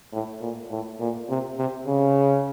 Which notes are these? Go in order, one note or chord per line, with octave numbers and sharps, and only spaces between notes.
A2
A#2
A2
A#2
C3
C3
C#3